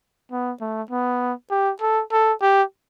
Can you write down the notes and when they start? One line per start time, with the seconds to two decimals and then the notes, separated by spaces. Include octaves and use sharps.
0.31 B3
0.61 A3
0.91 B3
1.51 G4
1.81 A4
2.12 A4
2.42 G4